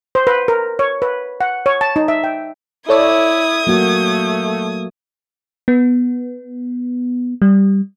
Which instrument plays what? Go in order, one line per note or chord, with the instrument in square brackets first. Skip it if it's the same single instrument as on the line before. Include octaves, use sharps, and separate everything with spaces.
[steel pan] C5
B4
A#4
C#5
B4
F#5
C#5
A5
D#4
E5
G5
[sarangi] E4 [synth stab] A4 C#5 D5 [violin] D#6 G#6
[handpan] F#3 A#3 F#4 [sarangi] A3
[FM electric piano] B3
G3